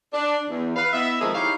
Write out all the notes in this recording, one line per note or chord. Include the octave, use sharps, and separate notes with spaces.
D4
E2
B4 F5
B3 E4 D#5 E5
D#3 F3 G#3 A3 C4 G#4
D#4 E4 G4 C#5 F5